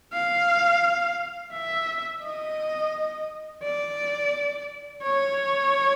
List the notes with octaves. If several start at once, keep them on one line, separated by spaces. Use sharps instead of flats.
F5
E5
D#5
D5
C#5